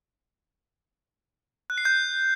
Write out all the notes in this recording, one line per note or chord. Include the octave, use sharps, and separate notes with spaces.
F#6
C7
G6